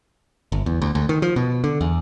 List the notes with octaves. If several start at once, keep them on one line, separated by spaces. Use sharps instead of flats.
G1
E2
D2
D2
D#3
F3
B2
D3
E2